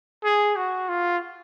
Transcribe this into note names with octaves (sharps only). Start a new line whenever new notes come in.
G#4
F#4
F4